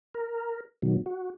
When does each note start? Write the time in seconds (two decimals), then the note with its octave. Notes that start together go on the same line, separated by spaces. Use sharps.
0.14 A#4
0.82 B2 D#3 F#3
1.06 F#4